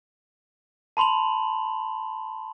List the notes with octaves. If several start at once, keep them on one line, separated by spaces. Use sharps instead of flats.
A5 B5 C6 F7 F#7